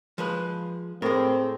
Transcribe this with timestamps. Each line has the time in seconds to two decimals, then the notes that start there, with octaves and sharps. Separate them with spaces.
0.18 F3 G#3 B4
1.02 A2 G#3 C4 A#4